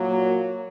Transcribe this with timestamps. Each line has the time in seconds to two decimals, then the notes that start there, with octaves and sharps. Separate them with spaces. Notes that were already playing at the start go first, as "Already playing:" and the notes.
Already playing: A#2 F#3 A#3